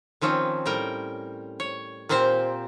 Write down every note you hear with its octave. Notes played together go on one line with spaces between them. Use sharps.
D#3 F3 C4 C#4
A2 G3 A#4 G5
C#5
A#2 A#3 C4 G4 C5